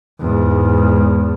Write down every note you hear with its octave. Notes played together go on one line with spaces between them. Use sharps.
E2 G#2